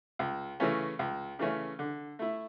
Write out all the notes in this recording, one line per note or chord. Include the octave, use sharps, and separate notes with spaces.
C#2
C#3 E3 A3 C#4
C#2
C#3 E3 A3 C#4
D3
A3 E4